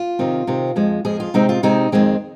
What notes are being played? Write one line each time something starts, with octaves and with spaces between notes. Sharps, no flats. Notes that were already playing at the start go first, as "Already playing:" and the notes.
Already playing: F4
C3 D#3 C4
C3 D#3 C4
F2 F3 G#3
F2 F3 G#3 G#4
F4
C3 G#3 C4 D#4
F4
C3 G#3 C4 D#4
F2 D#3 G#3 C4